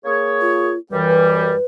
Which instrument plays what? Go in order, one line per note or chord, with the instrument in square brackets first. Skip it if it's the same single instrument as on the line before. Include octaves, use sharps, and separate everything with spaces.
[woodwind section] A#3 G#4 C#5
[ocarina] F4
[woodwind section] F#2 E3 G3 [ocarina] B4
[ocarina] B4